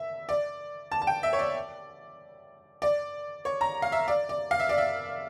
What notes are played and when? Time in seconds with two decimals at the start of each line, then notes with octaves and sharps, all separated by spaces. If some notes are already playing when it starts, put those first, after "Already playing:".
Already playing: E5
0.29 D5
0.92 A5
1.02 A5
1.07 G5
1.23 E5
1.33 C#5
1.39 D5
2.82 D5
3.45 C#5
3.61 A#5
3.82 F5
3.92 E5
4.08 D5
4.29 D5
4.51 F5
4.59 E5
4.69 D5
4.78 E5